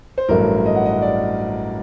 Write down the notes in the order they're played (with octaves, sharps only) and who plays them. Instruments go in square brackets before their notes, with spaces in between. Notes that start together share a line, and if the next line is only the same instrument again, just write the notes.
[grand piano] C5
A1 G2 F#3 A3 A#4
D#5
F#5
D#5
D5